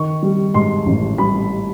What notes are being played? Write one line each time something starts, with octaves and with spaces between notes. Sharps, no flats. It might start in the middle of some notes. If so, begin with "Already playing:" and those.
Already playing: D#3 C#6
G3
G#2 C6
A1
G3 B5